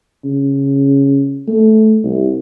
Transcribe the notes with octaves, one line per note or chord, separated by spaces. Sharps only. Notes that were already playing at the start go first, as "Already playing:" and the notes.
C#3
A3
C2